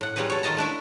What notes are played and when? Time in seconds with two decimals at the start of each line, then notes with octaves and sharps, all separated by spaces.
0.01 A2 F#5
0.16 F#3 G3 B3 C4 G#4 B4
0.30 A4 C#5
0.43 D#3 F4 A4 D#5 A5 A#5
0.57 A3 D4 E4 E5